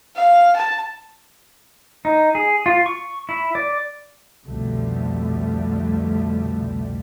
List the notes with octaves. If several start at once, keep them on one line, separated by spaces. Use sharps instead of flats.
F5
A5
D#4
G#4
F4
C#6
E4
D5
C2 F2 B2 D3 G3 A3